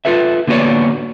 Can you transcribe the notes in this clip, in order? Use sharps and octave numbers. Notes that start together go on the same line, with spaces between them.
F4 A4 B4 E5
D3 A#3 B3 F#4 C#5 D5